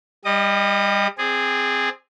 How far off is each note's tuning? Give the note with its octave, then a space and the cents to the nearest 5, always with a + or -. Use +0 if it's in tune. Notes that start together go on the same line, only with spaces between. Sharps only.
G3 +25 D#5 +0 D#6 -40
C4 +0 G#4 -5 D5 +30